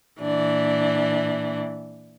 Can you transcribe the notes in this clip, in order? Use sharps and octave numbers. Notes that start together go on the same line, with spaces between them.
A#2 E3 D4